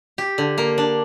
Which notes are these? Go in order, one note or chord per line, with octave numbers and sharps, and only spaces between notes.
G4
D3
A#3
D4